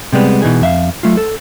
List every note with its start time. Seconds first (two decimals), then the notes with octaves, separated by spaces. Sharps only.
0.13 C3 G3 G#3 B3
0.42 B2 E3 D#4 G#4
0.61 F2 E5 F5
1.03 F#3 A3 F4
1.17 A4